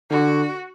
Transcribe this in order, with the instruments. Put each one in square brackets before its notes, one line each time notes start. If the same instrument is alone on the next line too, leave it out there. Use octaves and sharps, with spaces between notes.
[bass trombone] D3 [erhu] F#4